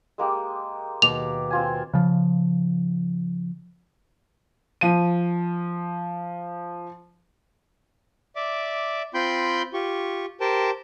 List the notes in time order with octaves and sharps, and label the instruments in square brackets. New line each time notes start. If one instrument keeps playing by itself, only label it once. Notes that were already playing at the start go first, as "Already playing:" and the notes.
[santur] G#3 A#3 G4
[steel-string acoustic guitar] D#2 B2 [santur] D6 [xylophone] F7
[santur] C4 F4 G#5
[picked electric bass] C#3 F3
[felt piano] F3 D#7
[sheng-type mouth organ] D5 E5 D6
C4 F4 G5 B5 C6 G6
F4 G4 C#6
G4 A#4 C5 G5 A5